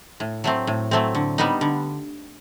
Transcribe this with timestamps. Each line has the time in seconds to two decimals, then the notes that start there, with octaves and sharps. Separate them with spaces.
0.20 A2
0.44 F#3 A3 C4
0.67 A2
0.91 F#3 A3 C4
1.15 D3
1.38 G3 B3 D#4
1.61 D3